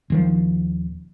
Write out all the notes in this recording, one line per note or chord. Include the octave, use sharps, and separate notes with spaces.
D#1 D#3 F3